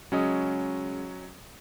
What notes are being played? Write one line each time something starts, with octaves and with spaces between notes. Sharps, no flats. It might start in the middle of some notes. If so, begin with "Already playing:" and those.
C#3 F#3 G#3 C#4 D#5 D#6